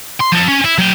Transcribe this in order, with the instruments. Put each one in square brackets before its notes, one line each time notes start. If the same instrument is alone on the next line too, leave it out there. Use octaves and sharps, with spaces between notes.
[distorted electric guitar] C6
F3 A4
C#4
E4
F#3 G5